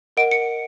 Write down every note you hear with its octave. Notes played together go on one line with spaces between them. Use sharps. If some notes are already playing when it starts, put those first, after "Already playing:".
A#4 D#5 F#5 D7
C#7